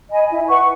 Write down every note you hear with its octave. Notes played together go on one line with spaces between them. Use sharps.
D#5 G#5 B5
E4
B4 F#5 C#6